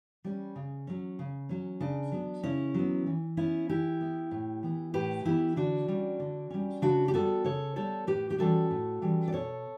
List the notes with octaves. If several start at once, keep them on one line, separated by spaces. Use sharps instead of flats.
G3 C#4
C#3
F#3 C#4
C#3
F#3 C#4
C#3 D4
F#3 B3
C#3 C#4 E4
F#3 B3
E3
B3 C#4 E4
E3 E4 G4
B3
A2
E3 B3
A2 G4 B4
E3 B3 E4 G4
D3 D4 F#4
G3 C#4
D3
G3 C#4
C#3 D4 F#4
G4
G3 B3 F#4 A4
C#3 A4 C#5
G3 B3 A4 C#5
A2 G4 B4
G4
E3 G3 C#4 F#4 A4
A2
E3 G3 C#4
D5
B2 A4 C#5